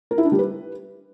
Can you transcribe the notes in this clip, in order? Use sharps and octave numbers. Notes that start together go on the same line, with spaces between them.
A#4
E4
D4
G3
B4